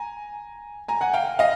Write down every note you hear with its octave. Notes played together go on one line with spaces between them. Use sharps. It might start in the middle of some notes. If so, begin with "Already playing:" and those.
Already playing: G#5 A#5
G#5 A#5
F#5 G#5
F5 G5
D#5 F5